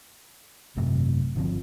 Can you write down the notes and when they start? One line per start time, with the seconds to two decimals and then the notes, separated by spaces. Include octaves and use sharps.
0.76 G#1 F#2 C3 A3
1.35 G1 D3 F3 C4